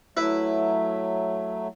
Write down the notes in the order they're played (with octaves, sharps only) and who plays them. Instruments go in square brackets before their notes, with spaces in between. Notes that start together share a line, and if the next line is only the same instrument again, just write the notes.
[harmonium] F#3 A3 [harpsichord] E4 B4